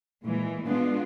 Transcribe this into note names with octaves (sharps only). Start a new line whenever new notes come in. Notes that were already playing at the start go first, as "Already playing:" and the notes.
A#2 E3 G#3
G#3 B3 D4 F4